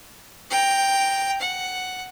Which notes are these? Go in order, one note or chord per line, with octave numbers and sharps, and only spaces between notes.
G5 A#5
F#5